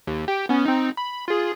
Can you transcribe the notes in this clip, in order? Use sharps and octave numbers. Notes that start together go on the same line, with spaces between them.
D#2
G4 G5
B3 C#4
C4 D#4
B5
F4 G#4